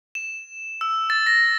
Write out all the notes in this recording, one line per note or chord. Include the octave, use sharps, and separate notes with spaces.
E7
E6
A6
A#6